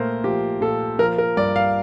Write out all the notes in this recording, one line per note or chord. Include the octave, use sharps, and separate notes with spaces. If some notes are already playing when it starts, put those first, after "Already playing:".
Already playing: A#2 A3 A#4 C5
F3 G4
A#2 A4
F3 A#4
A#4
G2 D5
F5